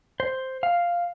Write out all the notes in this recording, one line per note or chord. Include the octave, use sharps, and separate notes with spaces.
C5
F5